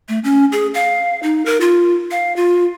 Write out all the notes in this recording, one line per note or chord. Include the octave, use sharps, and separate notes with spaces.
A3
C#4
G#4
F5
D#4
A#4
F4
F5
F4